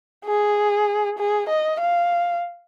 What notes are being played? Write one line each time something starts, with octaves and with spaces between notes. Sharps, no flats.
G#4
G#4
D#5
F5